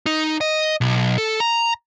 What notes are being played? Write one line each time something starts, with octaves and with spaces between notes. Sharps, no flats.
D#4
D#5
B1
A4
A#5